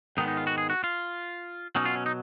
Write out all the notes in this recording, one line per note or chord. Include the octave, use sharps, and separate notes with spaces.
G#2 D#3 G#3 B3 D#4
D#4
F4
F#4
G#4
F#4
F4
B2 F#3 C#4 D#4
F4
C#4
D#4